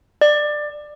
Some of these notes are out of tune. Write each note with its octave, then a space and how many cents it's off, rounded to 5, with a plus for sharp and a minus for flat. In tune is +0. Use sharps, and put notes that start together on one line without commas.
D5 +20